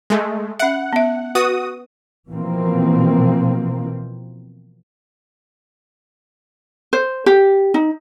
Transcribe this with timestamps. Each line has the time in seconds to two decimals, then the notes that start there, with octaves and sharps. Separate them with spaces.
0.10 G#3 A3
0.59 C#4 E5 F#5
0.93 B3 E5
1.35 F#4 B4 D#6
2.29 B2 E3 F3 A#3 C4
6.93 C5
7.26 G4
7.74 D#4